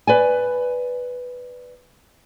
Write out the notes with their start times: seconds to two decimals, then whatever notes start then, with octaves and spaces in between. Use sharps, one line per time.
0.07 B4 D5 G#5